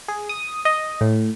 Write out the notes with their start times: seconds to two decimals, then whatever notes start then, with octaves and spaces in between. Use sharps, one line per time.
0.08 G#4
0.29 D#6
0.65 D#5
1.01 A2